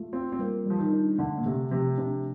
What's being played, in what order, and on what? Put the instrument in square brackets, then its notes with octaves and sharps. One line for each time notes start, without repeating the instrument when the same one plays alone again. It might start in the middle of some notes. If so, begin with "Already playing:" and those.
Already playing: [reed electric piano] A3 F4
[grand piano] C4 [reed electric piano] F4
[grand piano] C4
[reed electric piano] G3 [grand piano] A#3
[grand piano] F3 [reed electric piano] G3
[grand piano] D#3
[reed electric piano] D4
[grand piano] D3 [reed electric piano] A3
[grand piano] A#2
[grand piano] C3 [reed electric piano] A3
[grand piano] C3 [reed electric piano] F3
[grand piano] C3 [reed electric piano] D4